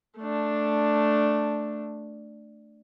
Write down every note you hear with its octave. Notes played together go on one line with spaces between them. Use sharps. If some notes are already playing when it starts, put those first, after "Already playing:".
A3 D4